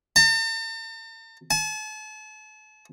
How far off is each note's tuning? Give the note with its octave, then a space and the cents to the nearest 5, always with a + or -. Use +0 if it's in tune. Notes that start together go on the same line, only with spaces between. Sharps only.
A5 +45
A5 -40